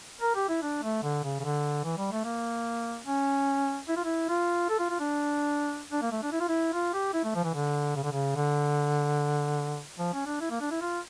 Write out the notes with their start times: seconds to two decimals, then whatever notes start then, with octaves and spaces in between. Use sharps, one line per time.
0.21 A#4
0.35 G4
0.48 E4
0.62 D4
0.83 A3
1.03 D3
1.24 C#3
1.40 C#3
1.44 D3
1.84 E3
1.98 G3
2.12 A3
2.25 A#3
3.06 C#4
3.88 E4
3.97 F4
4.04 E4
4.29 F4
4.70 A4
4.79 F4
4.90 F4
5.00 D4
5.92 D4
6.02 A#3
6.12 A3
6.23 D4
6.32 E4
6.40 F4
6.49 E4
6.74 F4
6.94 G4
7.14 E4
7.24 A3
7.35 F3
7.44 E3
7.54 D3
7.96 C#3
8.04 D3
8.12 C#3
8.36 D3
9.99 F3
10.13 C#4
10.26 D4
10.40 E4
10.50 A#3
10.61 D4
10.71 E4
10.81 F4